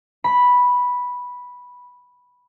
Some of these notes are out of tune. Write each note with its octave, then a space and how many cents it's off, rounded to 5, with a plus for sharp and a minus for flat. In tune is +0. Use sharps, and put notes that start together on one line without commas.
B5 -5